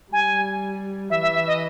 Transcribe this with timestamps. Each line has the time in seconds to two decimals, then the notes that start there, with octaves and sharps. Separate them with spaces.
0.12 G3 G#5
1.10 E3 E5
1.22 E5
1.35 E5
1.47 D#5